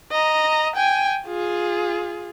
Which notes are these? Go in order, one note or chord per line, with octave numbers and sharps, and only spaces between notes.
D#5 A#5
G5 G#5
F4 G#4